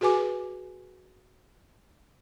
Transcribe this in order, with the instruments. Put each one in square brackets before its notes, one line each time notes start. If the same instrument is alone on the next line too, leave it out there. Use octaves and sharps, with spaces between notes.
[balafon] F#4 G#4 B4 G#5 D6